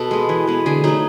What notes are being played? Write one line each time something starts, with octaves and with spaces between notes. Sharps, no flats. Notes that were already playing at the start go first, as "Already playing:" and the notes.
Already playing: B2 A4
G#3 B3
E3
G#3 B3
D3 G#4
F#3 A3 D#4